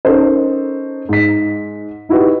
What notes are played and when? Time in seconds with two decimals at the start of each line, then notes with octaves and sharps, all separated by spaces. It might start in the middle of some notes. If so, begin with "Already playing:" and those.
0.05 C#4 D#4 A4 A#4 C5
1.09 G#2 B6
2.09 D#4 E4 F#4 G4 B4